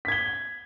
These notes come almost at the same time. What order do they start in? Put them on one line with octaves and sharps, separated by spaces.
B6 G#6 G7